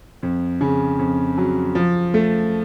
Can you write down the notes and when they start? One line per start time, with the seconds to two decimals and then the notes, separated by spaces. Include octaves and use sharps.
0.23 F2
0.61 C#3
0.99 F2
1.38 F#3
1.75 F3
2.14 A3